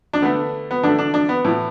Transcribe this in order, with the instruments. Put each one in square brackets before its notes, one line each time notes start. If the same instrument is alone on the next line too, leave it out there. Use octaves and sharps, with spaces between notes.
[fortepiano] D4
D3 A3 B3
B3
D3 A3 D4
D4
D4
B3
A2 E3 B3